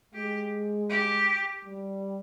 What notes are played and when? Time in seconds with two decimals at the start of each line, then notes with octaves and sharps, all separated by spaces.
0.14 G#3 G4
0.90 G4
1.65 G3